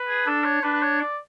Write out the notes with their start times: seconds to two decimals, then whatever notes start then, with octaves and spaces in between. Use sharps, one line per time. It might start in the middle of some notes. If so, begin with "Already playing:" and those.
Already playing: B4
0.08 G#4
0.26 D4 A4
0.44 C#5
0.63 D4 B4
0.74 B4
0.82 C#5
1.00 D5